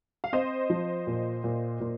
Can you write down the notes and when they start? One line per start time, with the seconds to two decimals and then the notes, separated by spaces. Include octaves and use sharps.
0.24 F5
0.33 C4 C5 D#5
0.70 F3
1.07 A#2
1.44 A#2
1.80 A#2